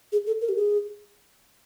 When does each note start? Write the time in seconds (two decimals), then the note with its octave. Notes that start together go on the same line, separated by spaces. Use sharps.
0.12 G#4
0.27 A4
0.41 A#4
0.49 G4
0.56 G#4